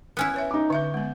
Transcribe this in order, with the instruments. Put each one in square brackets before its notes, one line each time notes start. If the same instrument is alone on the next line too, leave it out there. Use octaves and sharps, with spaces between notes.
[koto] B3 C#4 E4
[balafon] B4 C#5 E5
[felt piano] D#4 D6
[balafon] D3 E5 [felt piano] C#6 G6
[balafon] G#3 B3